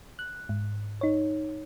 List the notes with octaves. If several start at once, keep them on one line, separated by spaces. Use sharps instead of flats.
F#6
G#2
D#4 C#5